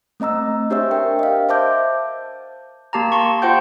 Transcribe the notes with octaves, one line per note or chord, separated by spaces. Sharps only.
A3 C4 D#5 A#5 E6
D4 G4 C5 C#5 E5 E6
A#4 G5
D#5 F5
C5 E5 A5 D6 G6
A#3 G4 A5 A#5
A5 C6 C#6
F4 C5 F#5 G5 G6